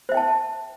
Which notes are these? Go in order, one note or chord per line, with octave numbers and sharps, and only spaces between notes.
C5 E5 G5 A5